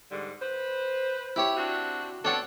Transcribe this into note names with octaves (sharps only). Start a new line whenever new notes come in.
G#2 D3 G3
B4 C5
E4 G4 C#5
C4 D4 F#4
B3 C4 D4 A4 C#5 F#5